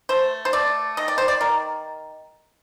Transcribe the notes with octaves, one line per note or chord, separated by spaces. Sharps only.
A3 C5
C5
A3 D5
D#3 D#5
D5
C5
D5
D#3 A#4